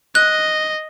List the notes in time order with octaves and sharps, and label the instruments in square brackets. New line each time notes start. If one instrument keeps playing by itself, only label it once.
[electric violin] D#5 [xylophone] F#6